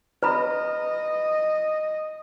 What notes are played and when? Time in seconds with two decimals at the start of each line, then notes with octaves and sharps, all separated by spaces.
0.23 B4 D#5 A#5 B5